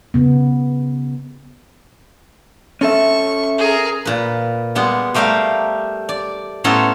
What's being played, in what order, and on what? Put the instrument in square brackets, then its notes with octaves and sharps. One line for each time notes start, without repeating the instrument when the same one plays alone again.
[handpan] C#3 B3
[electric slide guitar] C#4 A4 E5 [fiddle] C#6
[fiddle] G#4 A#4
[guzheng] A#2 B4
G3 G#3 B3
G3 A3 G4 A#4 F5
D5
A2 B3 C#4 A4 A#5 C6